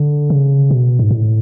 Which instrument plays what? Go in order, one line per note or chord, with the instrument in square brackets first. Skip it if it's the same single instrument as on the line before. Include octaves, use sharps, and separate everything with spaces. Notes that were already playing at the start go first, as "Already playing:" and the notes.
Already playing: [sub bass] D3
C#3
B2
G#2
A2